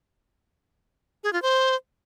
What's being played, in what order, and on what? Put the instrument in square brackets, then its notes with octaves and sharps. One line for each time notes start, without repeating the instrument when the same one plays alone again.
[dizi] G#4
F4
C5